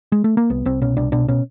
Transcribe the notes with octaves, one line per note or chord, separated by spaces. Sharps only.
G#3
A3
A#3
C2 B3
C2 C4
B2 C#4
C2 D4
B2 D4
B2 C#4